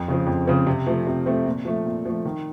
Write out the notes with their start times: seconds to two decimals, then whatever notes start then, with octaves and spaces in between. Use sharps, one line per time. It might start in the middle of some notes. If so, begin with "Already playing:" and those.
Already playing: F2
0.08 C#3 F3 C4
0.27 F2
0.47 C#3 F3 C4
0.67 C3
0.86 F3 A3 C4
1.07 C3
1.26 F3 A3 C4
1.46 A#2
1.65 F3 A3
1.86 A#2
2.05 F3 A3
2.25 D#3